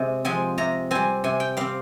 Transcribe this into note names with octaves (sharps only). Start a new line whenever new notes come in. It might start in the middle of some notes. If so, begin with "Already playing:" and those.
Already playing: C3 G#3
F3 G#3 C4 G#5
C3 A#5
G3 C4 G#5
C3 G#5
G5
G3 C4 F5